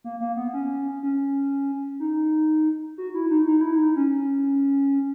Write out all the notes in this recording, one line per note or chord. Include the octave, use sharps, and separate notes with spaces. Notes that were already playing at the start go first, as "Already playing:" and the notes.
A#3
A#3
B3
C#4
C#4
D#4
F#4
E4
D#4
D#4
E4
D#4
C#4